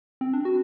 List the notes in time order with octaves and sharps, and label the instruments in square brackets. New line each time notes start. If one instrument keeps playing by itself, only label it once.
[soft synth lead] C4
D4
F#4